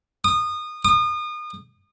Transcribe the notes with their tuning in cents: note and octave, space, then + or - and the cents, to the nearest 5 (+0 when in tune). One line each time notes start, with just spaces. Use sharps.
D#6 -25
D#6 -35